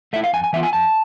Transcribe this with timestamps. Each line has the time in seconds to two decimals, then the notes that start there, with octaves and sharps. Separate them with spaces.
0.13 A3 E4 E5
0.24 F5
0.33 F2 G#5
0.44 G#5
0.53 E3 B3 F4 E5
0.63 G#5
0.73 F2 A5